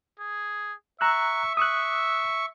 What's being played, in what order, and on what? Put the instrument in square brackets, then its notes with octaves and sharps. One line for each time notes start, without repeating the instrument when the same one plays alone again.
[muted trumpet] G#4
[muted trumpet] E5 [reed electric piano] A#5 E6 F#6 [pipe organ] C#6
[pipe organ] C#6 [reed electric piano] D#6 E6 F#6